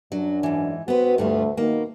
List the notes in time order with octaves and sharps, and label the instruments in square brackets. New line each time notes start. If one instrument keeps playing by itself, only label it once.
[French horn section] F#2 D4 [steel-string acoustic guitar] F#3
[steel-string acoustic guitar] G#2 E3
[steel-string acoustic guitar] B3 B4 [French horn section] C4 F#4
[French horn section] D2 A3 [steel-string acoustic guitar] G2 G3 F4
[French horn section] B2 D#3 [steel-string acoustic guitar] A#3